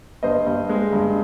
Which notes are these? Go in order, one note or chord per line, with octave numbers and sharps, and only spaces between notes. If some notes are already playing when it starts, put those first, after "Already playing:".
G2 C5 D#5
G2
G#3
G2